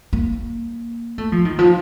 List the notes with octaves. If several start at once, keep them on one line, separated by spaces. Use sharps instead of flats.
A#3
A3
F3
D#3
F3